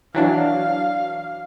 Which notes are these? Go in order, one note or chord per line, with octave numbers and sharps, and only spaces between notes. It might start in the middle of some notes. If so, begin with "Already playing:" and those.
E3 F#3 D4 F5